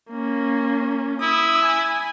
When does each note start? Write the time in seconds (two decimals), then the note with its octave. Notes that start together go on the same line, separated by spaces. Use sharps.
0.10 A#3 C#4
1.22 E4 D#6
1.65 G#5